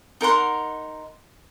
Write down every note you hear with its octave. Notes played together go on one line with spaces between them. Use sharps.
D#4 A#4 F#5 C6